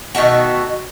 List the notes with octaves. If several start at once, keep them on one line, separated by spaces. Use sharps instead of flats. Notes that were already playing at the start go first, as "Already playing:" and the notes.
B2 D#3 A3 F#4